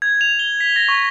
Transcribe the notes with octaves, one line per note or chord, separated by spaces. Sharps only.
G#6
F7
G7
B6
A#6
C#6